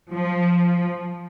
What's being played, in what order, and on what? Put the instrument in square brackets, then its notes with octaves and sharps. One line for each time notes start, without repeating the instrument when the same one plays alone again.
[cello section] F3